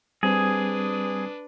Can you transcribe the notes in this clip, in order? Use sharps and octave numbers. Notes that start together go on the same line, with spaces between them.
G3 C4 D4 G#4 B4 C5